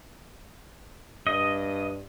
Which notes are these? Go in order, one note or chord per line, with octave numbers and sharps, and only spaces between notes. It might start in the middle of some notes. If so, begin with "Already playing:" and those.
G2 D#5